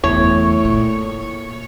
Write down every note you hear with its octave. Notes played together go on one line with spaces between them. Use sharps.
F#1 E2 A2 C#5
A#2